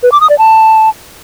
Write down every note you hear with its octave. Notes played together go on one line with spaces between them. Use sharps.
B4
D6
D#6
D5
A5